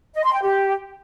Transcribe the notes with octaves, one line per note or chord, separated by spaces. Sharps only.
D#5
C6
G5
G4